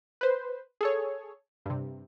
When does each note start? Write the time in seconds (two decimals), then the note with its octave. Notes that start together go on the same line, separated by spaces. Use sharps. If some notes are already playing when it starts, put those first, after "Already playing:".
0.21 B4 C5
0.81 G#4 A4 C#5
1.66 G2 C3